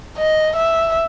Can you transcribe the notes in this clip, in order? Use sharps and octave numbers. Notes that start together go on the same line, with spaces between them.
D#5
E5